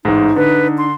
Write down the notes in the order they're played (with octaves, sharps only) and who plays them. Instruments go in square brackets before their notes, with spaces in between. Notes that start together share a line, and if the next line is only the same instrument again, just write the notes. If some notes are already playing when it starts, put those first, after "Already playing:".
[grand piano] A1 G#2 [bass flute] D#4
[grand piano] D3 [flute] B4
[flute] C6